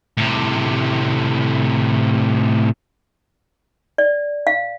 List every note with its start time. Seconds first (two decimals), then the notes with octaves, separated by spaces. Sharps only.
0.18 A2 C3
3.98 D5
4.47 F5